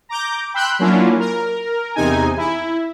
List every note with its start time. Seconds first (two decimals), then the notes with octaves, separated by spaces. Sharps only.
0.09 A#5 D6 G6
0.54 G5 B5 C6 E6 F#6 G6
0.79 F#3 A#3 C#4 D4 E4 F4
1.19 A#4
1.95 E2 C3 D#4 G#5
2.37 E4